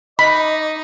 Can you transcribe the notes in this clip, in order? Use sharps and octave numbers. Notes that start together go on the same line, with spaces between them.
D#4 D#5 B5 D6